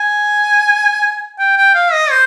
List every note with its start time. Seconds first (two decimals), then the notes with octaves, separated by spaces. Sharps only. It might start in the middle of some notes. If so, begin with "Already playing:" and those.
Already playing: G#5
1.39 G5
1.57 G5
1.75 F5
1.93 D#5
2.11 C5